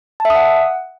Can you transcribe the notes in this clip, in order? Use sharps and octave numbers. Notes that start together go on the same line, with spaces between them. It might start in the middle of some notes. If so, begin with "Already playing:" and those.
A5
E5
D#6
F#5